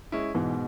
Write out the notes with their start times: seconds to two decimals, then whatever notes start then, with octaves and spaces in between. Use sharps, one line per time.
0.12 G#3 C#4 E4
0.34 G#2 B2 E3